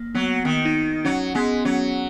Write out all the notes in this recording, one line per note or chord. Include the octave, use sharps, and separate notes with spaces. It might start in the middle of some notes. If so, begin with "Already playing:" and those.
Already playing: A#3
F#3 B3
D#3 B3
D#4
F#3 C#4
G#3 B3
F#3 C#4